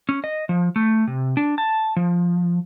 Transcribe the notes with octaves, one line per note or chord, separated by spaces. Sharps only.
C#4
D#5
F3
A3
C3
D4
A5
F3